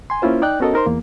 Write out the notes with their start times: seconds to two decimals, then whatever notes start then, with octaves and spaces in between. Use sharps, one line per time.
0.10 G#5 C6
0.22 A#3 C#4 E4 F4 C5
0.42 D#4 D5 G5 F#6
0.60 B3 C#4 F#4 A4 A#4 D#5
0.74 D#4 A#4 C5 C6
0.86 E2 A#3